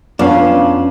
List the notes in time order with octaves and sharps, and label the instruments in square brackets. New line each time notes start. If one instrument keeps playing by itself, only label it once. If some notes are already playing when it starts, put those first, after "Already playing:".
[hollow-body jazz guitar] F2 D4 [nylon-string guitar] B3 C#4 F5